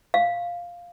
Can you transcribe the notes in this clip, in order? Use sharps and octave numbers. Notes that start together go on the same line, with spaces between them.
F5